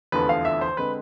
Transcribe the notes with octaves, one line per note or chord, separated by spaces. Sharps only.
F1 E2 D3 F3 B4
F5
E5
C5
D3 G#3 C4 B4